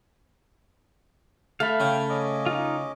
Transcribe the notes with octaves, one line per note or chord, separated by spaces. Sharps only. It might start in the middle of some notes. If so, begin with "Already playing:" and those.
A3 F5 B5
C#3 G5
C#4 D#5 D6
D#4 F4